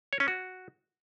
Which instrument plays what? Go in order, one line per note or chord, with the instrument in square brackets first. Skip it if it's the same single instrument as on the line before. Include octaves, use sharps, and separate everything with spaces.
[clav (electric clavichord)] C#5
C#4
F#4